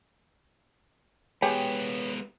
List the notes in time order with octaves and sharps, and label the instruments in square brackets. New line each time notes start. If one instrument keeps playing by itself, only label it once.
[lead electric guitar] G#3 B3 [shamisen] G4 G#4 G5 [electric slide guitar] B4 C#5